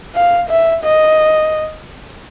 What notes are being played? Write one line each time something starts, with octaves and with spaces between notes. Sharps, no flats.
F5
E5
D#5